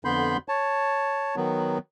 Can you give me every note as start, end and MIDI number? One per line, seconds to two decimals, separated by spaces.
0.05 0.37 41
0.05 0.37 50
0.05 0.37 59
0.05 0.37 83
0.05 0.37 84
0.05 0.37 91
0.48 1.35 73
0.48 1.35 81
1.36 1.78 51
1.36 1.78 54
1.36 1.78 59